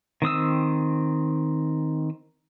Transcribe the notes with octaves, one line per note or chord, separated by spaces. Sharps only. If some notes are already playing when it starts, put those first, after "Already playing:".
D#3 C4 D#6 E6